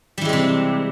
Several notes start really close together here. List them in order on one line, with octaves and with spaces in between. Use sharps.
G3 E3 G#3 C4 C3